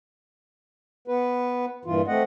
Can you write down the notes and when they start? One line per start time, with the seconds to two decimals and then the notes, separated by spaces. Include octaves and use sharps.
1.08 B3 B4
1.85 G2 A#2 E3 F4
2.07 A3 C4 D#5 F#5